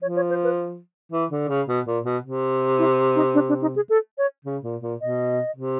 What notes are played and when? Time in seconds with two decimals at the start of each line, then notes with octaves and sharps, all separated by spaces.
0.02 F3 C#5
0.16 C#5
0.30 C5
0.44 B4
1.12 E3
1.31 D3
1.49 C#3
1.68 B2
1.86 A#2
2.05 B2
2.23 C3
2.79 E4
3.15 D#4
3.34 D4
3.49 D4
3.61 D#4
3.76 G#4
3.89 A4
4.18 C#5
4.45 C#3
4.63 A#2
4.82 A#2
5.01 B2 D#5
5.56 C3